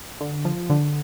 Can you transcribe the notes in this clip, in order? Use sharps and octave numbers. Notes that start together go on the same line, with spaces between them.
D3
F3
D3